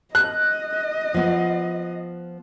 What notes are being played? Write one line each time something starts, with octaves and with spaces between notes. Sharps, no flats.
D#5 F#6
F3 B3